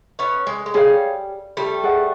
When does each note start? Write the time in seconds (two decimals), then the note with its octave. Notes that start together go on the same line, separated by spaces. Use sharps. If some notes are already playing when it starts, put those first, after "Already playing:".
0.19 B3 C#4
0.47 G#3
0.66 G#3
0.74 G3 G#4 C#5 F5
1.57 G3 A3
1.83 G#4 B4 D5 F#5